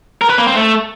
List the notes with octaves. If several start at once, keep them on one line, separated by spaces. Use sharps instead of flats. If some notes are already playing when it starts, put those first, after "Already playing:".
A#4
B4
A#3
C4
A3